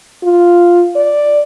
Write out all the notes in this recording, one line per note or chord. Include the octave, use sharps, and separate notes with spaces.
F4
D5